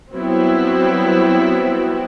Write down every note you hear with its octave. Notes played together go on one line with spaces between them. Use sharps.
F#3 G3 B3 C4 E4 F#4